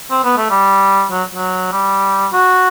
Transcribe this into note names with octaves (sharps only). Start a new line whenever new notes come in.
C4
B3
A3
G3
F#3
F#3
G3
F#4